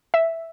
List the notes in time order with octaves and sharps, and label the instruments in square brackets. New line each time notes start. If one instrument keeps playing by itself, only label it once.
[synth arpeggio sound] E5